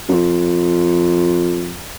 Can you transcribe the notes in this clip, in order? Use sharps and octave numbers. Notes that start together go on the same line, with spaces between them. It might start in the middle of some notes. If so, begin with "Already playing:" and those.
F#2
F2